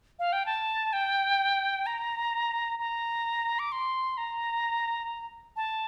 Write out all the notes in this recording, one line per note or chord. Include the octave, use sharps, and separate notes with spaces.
F5
G5
A5
G5
A#5
A#5
D6
C6
A#5
A5